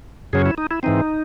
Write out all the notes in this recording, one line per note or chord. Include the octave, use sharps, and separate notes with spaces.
F#2 C#3 F#3 C#4 G#4
E4
D#4
E4
G#2 E3 C4 D#4